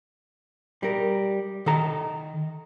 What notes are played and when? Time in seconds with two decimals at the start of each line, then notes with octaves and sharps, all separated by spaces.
0.83 G3 A#4
1.66 D#3 A4 A#5